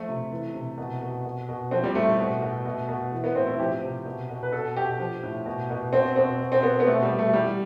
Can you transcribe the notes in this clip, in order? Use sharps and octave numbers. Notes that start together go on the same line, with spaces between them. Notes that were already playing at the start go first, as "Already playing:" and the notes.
Already playing: F3 A3
C3
E3
C3
B2
B2
B2
B2
F3 C4
G3
A2 A3
B2
B2
B2
B2
E3
B3
A2 C4
E4
F3 G4
C3
B2
B2
B4
B2 A4
B2 G4
F3
A2
B2
B2
B2 C4
B2 C4
B2
C4
B2 B3
B3
B2 A3
G3
B2
A3
E3 G3